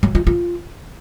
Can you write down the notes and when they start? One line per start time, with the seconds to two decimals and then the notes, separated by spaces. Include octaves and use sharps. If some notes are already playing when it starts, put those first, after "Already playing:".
0.03 F#3
0.15 F4
0.27 F4